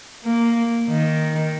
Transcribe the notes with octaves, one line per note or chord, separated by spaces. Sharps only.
A#3
D#3